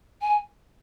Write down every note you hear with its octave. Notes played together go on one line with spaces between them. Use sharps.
G#5